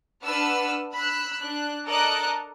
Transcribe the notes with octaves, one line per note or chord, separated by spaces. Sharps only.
D4 B4 F#5 A5 E6 F6
B5 E6 F#6
D4 F#6
A4 A#4 D5 D#5 F#6